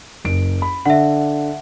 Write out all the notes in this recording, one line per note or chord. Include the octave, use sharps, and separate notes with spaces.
F#1 D7
B5
D3 E5 F#5